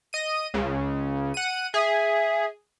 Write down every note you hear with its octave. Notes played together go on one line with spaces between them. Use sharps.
D#5 D#7
C#2 C#3
F#5 D#7
G#4 E5